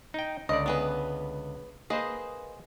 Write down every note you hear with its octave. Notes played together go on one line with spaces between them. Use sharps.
D#4 G5
C#2 D3 D5 D#5
B3 G#4 B4
A#3 G#4 B4 C5 D#5